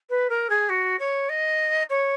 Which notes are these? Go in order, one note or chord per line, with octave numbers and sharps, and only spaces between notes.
B4
A#4
G#4
F#4
C#5
D#5
C#5